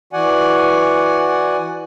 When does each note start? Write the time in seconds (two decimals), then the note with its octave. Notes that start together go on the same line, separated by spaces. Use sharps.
0.13 E3 F#4 D5 F#5 G#5